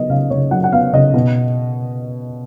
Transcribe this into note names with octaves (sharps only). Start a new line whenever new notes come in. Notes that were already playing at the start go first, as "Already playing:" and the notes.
Already playing: F#3 B3 D#5
C#3 F5
C#3 C#5
F#3 F#5
F#5
B3 F5
C#3 D#5
B2